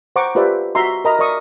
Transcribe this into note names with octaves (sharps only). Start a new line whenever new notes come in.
C5 F#5 A#5 C#6 D6
F4 G4 B4 C5 D5 E5
F#4 E5 A#5 C6
A#4 D#5 E5 A#5 B5
A#4 D5 E5 C#6 D#6